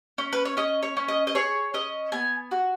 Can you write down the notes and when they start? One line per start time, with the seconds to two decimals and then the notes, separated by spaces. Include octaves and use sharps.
0.18 C#4
0.33 B4
0.45 C#5
0.57 C#4 D#5
0.83 C#5
0.97 C#4
1.08 D#5
1.27 D#5
1.35 G#4 C#5
1.74 C#4 D#5
2.12 B3 G#5
2.51 F#4